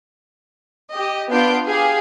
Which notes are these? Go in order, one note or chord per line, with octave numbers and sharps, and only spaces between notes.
G4 D#5
B3 D4 F4 C6 G6 D7
G4 G#4 F5